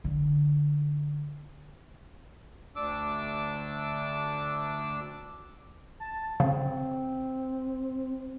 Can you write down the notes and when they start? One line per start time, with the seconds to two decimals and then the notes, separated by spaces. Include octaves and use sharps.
0.04 D3
2.76 D2 D4 D6 E6
6.00 A5
6.40 C#3 C4